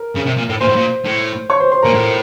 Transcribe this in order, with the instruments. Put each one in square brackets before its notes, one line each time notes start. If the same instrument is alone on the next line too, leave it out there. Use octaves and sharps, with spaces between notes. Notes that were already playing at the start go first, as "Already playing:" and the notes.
Already playing: [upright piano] A#4
[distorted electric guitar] C#3
C3
A#2
A2
[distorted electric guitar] A#2 [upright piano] C5 C6
[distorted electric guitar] A2
A#2
A2
[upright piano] C#5 C#6
C5 C6
C5 C6
[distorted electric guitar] A#2 [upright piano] A#4 A#5
[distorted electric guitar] A2